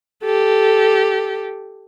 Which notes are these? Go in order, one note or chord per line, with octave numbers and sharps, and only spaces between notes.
G4 A4